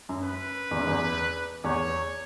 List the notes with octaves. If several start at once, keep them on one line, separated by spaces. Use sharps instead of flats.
F#2
B4
E2
F#2
E2
E2 C#5